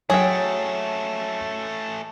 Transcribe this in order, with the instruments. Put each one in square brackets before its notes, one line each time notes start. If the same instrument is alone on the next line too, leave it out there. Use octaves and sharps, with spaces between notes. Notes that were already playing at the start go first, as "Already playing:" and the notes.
[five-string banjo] F#3 G5 [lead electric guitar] A3 C#4 [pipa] G#4 [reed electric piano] C#5